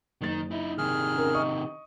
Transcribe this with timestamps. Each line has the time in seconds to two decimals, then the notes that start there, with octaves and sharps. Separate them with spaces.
0.21 F#1 D#3 A6
0.51 D#4 E4
0.78 C3 D#3 G#4 F6
1.14 C#4 A#4
1.34 D#5 C#6 D#6